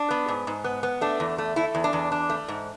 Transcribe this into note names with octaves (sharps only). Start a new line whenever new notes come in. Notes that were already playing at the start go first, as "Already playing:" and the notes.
Already playing: D4
B3
G#2
G#2
B3
B3
A3 D4
E2
A3
A3 E4
E2
D4
E2
D4
A3
G#2